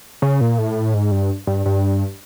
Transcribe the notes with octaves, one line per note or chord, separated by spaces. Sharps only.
C#3
A#2
A2
G#2
G2
G2
G2